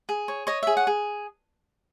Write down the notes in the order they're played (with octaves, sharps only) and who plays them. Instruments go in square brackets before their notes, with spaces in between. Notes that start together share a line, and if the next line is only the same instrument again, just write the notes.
[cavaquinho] G#4
C#5
C#5 D#5
G#4 E5
F#5
G#4